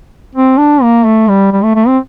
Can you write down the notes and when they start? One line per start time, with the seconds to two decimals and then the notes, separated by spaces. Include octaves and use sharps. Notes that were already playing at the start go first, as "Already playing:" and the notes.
0.35 C4
0.58 D4
0.82 A#3
1.06 A3
1.29 G3
1.53 G3
1.63 A3
1.75 A3
1.88 C4